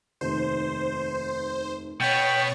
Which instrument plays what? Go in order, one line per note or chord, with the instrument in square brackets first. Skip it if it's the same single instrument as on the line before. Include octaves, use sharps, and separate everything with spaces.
[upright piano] F1 D#2 [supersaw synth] C5
[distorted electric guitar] B2 B3 [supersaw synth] C#5 C#6 A6 [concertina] G5